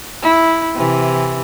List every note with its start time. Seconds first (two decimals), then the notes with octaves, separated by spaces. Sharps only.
0.22 E4
0.75 C3 E3